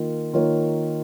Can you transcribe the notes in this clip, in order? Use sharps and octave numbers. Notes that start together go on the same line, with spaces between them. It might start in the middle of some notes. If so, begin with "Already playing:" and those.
Already playing: D#3 A#3 F4 A#4
D#3 A#3 F4 A#4 C#5